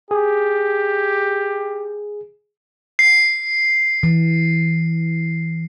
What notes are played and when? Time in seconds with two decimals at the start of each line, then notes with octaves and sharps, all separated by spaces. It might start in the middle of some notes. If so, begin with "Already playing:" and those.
0.11 G4 G#4
2.99 C7
4.03 E3